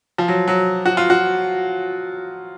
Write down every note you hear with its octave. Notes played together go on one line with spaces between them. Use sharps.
F3
F#3
F#3
F#4
F4
F#4